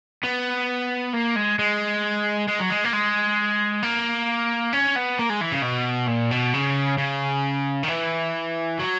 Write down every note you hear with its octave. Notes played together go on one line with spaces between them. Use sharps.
B3
A#3
G#3
G#3
G#3
F#3
G#3
A#3
G#3
A#3
C#4
B3
A#3
G#3
E3
C#3
B2
A#2
B2
C#3
C#3
D#3
E3
F#3